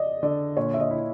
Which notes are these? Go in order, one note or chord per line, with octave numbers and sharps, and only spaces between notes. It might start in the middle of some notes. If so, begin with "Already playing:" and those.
Already playing: D5 D#5
D3 D5
A#2 C#5
E5
D#5
E4